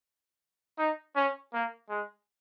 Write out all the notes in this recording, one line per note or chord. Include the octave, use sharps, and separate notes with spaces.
D#4
C#4
A#3
G#3